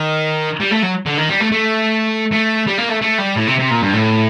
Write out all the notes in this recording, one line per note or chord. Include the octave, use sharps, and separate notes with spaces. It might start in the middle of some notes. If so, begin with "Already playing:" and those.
Already playing: D#3
G3
A3
F#3
D3
D#3
G3
A3
A3
A3
G3
A#3
A3
A3
G3
A2
C3
C3
A#2
G2
A2